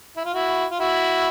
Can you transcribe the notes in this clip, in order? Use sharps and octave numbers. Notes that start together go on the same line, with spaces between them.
E4
F4
E4 F#4
F4
E4 F#4